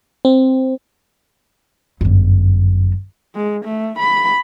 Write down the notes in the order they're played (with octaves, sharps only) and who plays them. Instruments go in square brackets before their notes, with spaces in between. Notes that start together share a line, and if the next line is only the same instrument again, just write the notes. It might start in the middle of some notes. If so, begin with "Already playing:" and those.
[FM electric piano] C4
[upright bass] G1 F#2
[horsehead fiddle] G#3
A3
B5